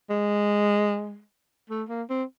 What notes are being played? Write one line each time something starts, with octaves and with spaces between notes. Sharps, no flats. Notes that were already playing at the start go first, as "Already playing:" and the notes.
G#3
A3
A#3
C4